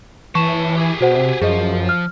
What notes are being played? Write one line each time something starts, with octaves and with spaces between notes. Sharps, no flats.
E3 C#5 A5 C#6 E7
G4 G#4
B2 F#4 C5 F#5
C3
F#2 F3 G#4 D#5
F6